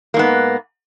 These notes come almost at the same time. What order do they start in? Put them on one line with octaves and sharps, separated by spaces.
A#3 G#2 B3